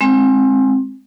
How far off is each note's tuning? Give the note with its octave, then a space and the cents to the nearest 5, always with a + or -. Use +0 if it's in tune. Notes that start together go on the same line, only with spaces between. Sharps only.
G#3 +0 C4 +20